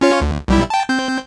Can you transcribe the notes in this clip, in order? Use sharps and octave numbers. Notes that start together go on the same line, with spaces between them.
C#4 F4 C#5
D2
B1 G3 E4
G5 A5
C4 G6